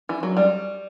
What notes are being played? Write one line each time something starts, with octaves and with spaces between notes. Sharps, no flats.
E3
F#3
G3